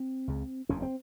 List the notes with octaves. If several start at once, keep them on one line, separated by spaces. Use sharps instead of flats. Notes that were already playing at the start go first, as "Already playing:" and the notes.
Already playing: C4
C#2 C#3
F#1 E2 C#3 C#4
C4